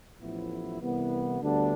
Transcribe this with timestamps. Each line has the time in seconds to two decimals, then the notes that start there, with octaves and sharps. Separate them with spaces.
0.20 A1 A2 F3 B3 E4
0.81 C2 C3 E3 B3
1.41 D2 D3 G3 B3 D4